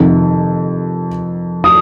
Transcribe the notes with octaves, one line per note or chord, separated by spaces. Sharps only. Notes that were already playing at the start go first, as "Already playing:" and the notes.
Already playing: F2 C3 D#3
D#6